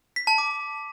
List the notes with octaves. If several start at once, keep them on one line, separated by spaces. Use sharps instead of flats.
B6
A5
D6